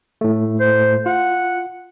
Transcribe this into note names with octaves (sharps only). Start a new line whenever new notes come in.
A2 A3
C5
F4 F#5